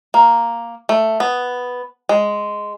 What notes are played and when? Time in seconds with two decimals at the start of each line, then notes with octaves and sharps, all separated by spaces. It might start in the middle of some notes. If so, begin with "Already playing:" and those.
0.14 A#3
0.89 A3
1.20 B3
2.09 G#3